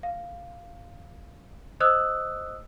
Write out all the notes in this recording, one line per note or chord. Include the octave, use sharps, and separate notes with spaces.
F5
C5 D#5 D#6 E6 F#6